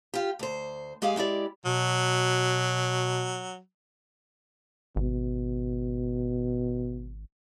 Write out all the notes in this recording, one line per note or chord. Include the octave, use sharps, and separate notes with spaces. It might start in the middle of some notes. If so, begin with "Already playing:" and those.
F4 G4
D2 C5
G#3 G4 G#4 F5 G#5
G#3 E4 G4 D5
B2 F#3
G#1 B2